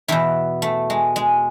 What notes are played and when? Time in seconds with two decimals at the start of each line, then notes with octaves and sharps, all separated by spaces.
0.08 E2 B2 E4
0.62 A3
0.90 G#3
1.16 G#3